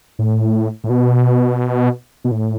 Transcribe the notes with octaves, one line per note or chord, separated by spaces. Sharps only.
A2
A2
B2
B2
A2